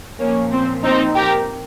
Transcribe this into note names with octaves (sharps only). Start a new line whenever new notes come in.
A#2 F3 A#3 C#4
C4
C4 D#4
G4 A#4